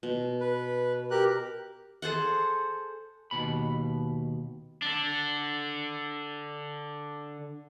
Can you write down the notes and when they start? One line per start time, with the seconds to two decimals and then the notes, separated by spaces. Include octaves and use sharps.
0.03 B2
0.40 B4
1.11 G4 A#4 F#6
2.02 G#4 A4 C5 F#5
3.31 D#2 B2 B5
4.82 D3 D4